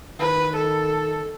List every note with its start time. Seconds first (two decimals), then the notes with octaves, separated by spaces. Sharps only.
0.19 D#3 B4
0.55 A4